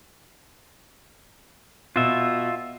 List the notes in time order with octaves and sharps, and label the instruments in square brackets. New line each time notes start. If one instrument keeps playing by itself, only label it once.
[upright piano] B2 [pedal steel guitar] F4 E5